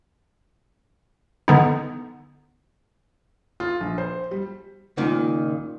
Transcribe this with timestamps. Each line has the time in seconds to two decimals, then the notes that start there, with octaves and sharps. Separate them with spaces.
1.48 D3 B3 D#4
3.60 F4
3.81 A#1
3.98 C5
4.31 G3
4.97 C#2 A#2 D#3